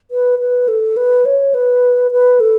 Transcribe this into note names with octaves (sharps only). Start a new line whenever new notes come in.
B4
B4
A4
B4
C#5
B4
B4
A4